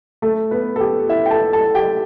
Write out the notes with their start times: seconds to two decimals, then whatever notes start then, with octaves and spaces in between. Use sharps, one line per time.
0.22 A3 A4
0.51 B3 B4
0.76 A4
0.80 G4
1.09 E4 E5
1.26 G5
1.31 A4 A5
1.53 A4 A5
1.74 G4 G5